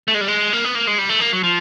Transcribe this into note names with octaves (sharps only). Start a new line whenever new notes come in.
A3
G#3
G3
G#3
A#3
B3
A#3
G#3
G3
A3
A#3
F#3
F3